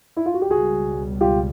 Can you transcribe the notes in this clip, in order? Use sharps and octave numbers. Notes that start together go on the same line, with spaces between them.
E4
F4
F#4
G4
C#2 B2 G3 F#4 G#4
F4 G4